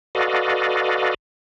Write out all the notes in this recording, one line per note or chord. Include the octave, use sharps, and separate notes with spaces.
F#4 A4 B4 D5 D#5 F5